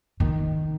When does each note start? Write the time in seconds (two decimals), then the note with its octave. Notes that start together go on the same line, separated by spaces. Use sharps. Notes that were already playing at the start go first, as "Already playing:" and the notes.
0.20 D#3